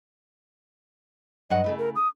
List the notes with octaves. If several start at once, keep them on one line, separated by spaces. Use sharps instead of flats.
G2 F#3 D#5 F#5
C#3 A3 E4
A#4
D#6